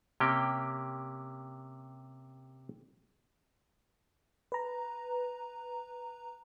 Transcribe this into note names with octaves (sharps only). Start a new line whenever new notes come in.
C3 A#3 C#4 G4 G5
B4 A#5